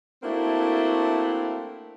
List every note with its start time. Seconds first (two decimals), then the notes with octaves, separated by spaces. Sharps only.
0.23 A3 A#3 C4 D4 E4 F#4